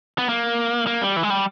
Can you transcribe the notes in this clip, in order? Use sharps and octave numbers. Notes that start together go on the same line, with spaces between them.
B3
A#3
A#3
G3
E3
G#3
G3